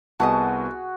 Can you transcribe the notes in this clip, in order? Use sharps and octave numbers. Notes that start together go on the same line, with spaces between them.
C2 B3 F#4 G#4 D#5 A5 B5 D#6